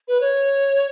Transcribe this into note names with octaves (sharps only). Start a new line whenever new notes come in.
B4
C#5